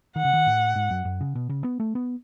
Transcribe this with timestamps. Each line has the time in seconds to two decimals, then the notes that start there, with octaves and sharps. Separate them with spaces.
0.16 D#3 F#5
0.25 C#3
0.34 D#3
0.46 A2
0.76 G#2
0.91 F#2
1.05 F#2
1.21 C#3
1.35 B2
1.49 C#3
1.64 B3
1.80 A3
1.95 B3